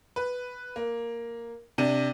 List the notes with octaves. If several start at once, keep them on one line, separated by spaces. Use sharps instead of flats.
B4
A#3
C3 D4 D#7